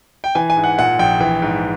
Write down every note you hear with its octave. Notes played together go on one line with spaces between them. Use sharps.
G5
E3 G#5
G#5
G#2
F#5
A#2 F#5
A#1 G5
E3 G5
G#2